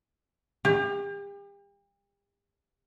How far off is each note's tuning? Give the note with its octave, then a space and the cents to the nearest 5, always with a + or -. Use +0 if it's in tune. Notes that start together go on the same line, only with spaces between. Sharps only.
G4 +40